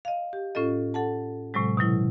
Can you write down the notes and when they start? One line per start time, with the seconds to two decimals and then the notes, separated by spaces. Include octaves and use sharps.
0.05 D#5 F5
0.33 G4
0.55 A2 C#4 F4 A4 D#5
0.94 A4 F#5 A5
1.54 A2 C3 F#3 G#3
1.77 B2 D#3 F#3 E4